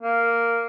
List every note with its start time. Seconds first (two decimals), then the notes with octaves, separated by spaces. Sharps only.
0.03 A#3